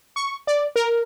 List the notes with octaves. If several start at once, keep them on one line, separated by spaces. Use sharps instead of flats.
C#6
D5
A#4